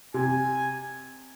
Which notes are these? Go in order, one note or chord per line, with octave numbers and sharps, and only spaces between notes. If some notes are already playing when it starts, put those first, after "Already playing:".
C3 G#5